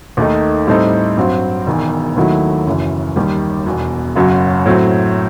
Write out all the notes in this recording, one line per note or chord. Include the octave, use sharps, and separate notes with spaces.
D#2 D#3 A3 D#4
A2 G3 C4 D#4 A4
G2 F#3 C4
E1 E2 D#3
D#2 D#3 F#3 A3 E4
F#1 F#2 E3
D#2 D#3 G3
E1 E2 B2
F#1 F#2 F#3
A2 F#3 C4